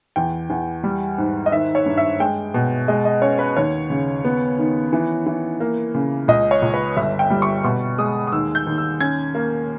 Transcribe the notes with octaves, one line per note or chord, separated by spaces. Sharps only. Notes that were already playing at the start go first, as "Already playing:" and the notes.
E2 G5
E2
G3
G#2
D#5
D#3 E5
C#5
G2
E5
G#3 G5
B2
G#3 D#5
D#5
C#4 C#5
B4
D#2 C#5
C#3
B3
D#3
E3
E3
A#3
C#3
C#2 D#5
C#5
C#2
B4
G1 E5
G5
G3
C#6
B2 C#6
G#3 D#6
D#6
D#2 E6
G6
D#2
E6
C#4 G#6
A#3